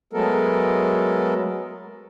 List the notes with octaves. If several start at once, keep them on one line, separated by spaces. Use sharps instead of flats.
F#3 G#3 A3 B3 A4 A#4